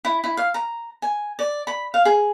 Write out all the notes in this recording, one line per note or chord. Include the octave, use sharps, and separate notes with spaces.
E4
E4
F5
A#5
G#5
D5
B5
F5
G#4